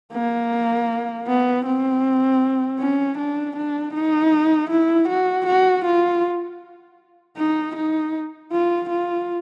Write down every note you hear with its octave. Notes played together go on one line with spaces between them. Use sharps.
A#3
B3
C4
C#4
D4
D4
D#4
E4
F#4
F#4
F4
D#4
D#4
F4
F4